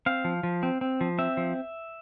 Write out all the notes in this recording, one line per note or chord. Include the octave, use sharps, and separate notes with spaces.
C4 F5
F3
F3
C4
C4
F3
C4 E5
F3